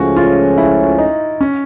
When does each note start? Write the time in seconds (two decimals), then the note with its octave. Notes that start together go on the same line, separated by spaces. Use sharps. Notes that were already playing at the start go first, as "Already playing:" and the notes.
Already playing: C#2 C#3 F3 A3 C#4 F#4
0.17 F4
0.58 E4
0.98 D#4
1.41 C#4